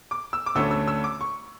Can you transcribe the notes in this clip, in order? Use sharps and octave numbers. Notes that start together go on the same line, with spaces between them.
D6
E6
D6
D2 D3 A3 C#4 E6
E6
E6
D6
C#6